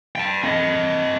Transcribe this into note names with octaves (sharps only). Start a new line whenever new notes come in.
G5 A5
C4 D#5